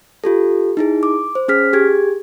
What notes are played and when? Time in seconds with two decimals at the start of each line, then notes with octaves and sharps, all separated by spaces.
0.24 F4 G4 A4
0.77 D#4 E4 G#4
1.03 D6
1.35 C5
1.48 C#4 G#4 F6 B6
1.73 G4 G#4 G#6